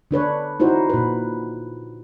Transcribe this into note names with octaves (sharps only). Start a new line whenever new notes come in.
D3 D4 B4 C#5
D#4 E4 F#4 C5
A#2 B4